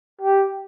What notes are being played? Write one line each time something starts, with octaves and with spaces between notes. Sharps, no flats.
G4